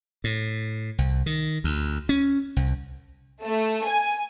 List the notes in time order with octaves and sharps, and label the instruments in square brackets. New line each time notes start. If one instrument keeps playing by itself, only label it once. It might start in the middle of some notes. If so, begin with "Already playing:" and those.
[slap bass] A2
C2
D#3
D2
C#4
C2
[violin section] A3
G#5